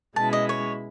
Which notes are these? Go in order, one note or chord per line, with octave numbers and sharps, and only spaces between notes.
B2 G#3 C#4 E4 A5
D#5
C#5